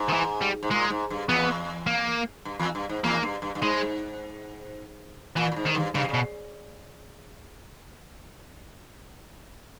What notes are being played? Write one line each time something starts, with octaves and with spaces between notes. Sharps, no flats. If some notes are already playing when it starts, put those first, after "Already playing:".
Already playing: G#2
D#3
E3
G3
G#2
A#2 G#3
G#2
G2
E2 B3
A#3
G2
E2
G2
G#2
E2 A#3
G2
G2
G2
G#2 G#3
A#2 E3
A#2
G#2
D#3
G2
G2 C#3
C#3
B2